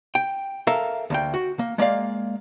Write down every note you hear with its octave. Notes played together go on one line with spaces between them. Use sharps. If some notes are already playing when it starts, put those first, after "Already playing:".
G5
A4 A#4 E5 F5 A#5
D2 A#3 G5
F#4
A#3
G#3 A#3 D5 F5